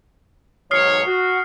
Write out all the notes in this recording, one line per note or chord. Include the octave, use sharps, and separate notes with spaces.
B1 G#2 C#5 D#6 F6 C7
F#4